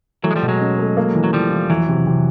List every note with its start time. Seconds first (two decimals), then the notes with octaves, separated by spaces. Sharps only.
0.23 E3 F#3 A3
0.31 G#3
0.36 F3 G3
0.43 B2
0.48 F#3 G#3
0.61 C#4
0.79 A3
0.97 A#3
1.15 E3
1.24 F#3
1.33 E3 F3 G3
1.52 E3
1.70 F2 E3 F#3
1.89 C3
2.06 C3